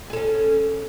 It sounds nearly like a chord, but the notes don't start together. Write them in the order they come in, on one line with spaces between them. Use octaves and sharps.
G#4 A4 C#4